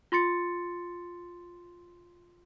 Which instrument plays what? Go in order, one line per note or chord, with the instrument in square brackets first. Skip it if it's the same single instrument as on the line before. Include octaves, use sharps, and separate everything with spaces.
[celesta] F4 C6 A6 C#7